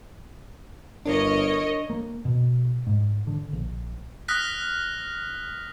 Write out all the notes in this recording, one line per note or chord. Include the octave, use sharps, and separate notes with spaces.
G1 D4 A#4 C#5 D#5
A#3
B2
G#2
D3
A#1
D#6 F6 F#6 A#6 B6